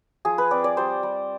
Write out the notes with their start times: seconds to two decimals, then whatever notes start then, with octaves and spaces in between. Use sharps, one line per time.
0.25 F3 G#4
0.38 B4
0.51 C4 D5
0.64 D5
0.77 G3 C5
1.03 G3